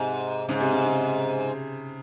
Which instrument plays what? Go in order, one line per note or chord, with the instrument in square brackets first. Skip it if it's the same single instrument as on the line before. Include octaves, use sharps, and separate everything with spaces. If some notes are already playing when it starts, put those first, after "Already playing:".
Already playing: [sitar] G#2 [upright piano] C3
[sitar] G#2 [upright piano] C#3
[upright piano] C3
C#3
C#3